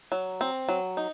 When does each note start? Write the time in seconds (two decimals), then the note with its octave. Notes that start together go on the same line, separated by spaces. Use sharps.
0.12 F#3
0.41 C4
0.69 F#3
0.97 D#4